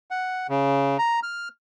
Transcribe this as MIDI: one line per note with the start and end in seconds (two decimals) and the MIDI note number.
0.11 0.47 78
0.49 0.97 49
0.99 1.20 82
1.23 1.48 89